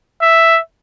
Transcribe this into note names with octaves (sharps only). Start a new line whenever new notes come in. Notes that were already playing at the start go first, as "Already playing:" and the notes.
E5